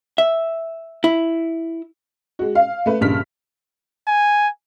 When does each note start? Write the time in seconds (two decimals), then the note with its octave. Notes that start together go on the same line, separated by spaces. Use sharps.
0.18 E5
1.04 E4
2.39 G#3 F#4
2.55 F5
2.86 A3 B4
3.01 A#1 G2 C#3 F6 B6
4.07 G#5